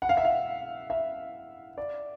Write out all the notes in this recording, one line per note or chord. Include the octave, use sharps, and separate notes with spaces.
F#5
F5
E5
F5
E5
D5